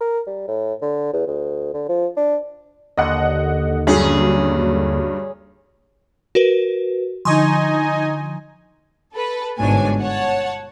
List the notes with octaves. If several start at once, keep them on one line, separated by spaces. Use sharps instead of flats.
A#4
G3
A2
D3
E2
D2
D3
F3
D4
D#2 D3 D#5 F#5
G2 F#3 C#4 G#4
F#4 A#4 B4
D3 F3 D#4 D#5 G#5 C6 C#6 D#6
A4 B4
G1 G#2 B2 D4 C#5 G#5
C#5 F#5 A5